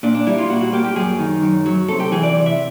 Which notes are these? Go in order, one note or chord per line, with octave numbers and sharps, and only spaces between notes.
A#2 D4
D4
G3 E4
F4
A#2 F#4
F#4
A#3 G4
G4
F#2 G#4
D#3
F#2
F#3
C3 A4
G4
E3 G#4
D5
C3
E5